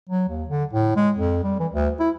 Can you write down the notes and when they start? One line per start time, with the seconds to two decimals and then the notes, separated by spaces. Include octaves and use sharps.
0.09 F#3
0.29 D#2
0.49 D3
0.73 A2
0.96 G#3
1.15 F2
1.44 G3
1.60 E3
1.72 D2
1.99 E4